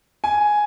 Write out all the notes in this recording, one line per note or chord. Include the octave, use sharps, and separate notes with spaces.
G#5